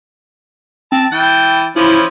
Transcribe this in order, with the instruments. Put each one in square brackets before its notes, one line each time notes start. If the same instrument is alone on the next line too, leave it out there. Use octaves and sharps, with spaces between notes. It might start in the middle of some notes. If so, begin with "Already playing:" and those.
[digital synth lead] C4 [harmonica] A5
[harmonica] E3 G5 [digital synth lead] A6
[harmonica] E3 F3 C#4 [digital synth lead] E4